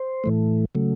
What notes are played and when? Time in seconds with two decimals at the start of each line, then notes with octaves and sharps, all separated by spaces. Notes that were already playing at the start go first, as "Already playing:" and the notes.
Already playing: C5
0.24 A2 E3 A3
0.75 C#3 F#3 A3